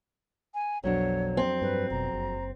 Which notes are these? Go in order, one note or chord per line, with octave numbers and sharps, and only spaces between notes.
G#5
B1 F2 B2 F#3 D4 C#5
C4
G2 B4
F1 B2 A#5
F#1